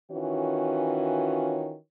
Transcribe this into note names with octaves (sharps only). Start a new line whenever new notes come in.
D#3 E3 C#4 F4 F#4 C#5